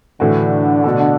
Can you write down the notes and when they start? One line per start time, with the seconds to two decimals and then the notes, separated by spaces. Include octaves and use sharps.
0.20 A2 D3 E3 A3 F#4
0.84 B2 A3 F#4 A4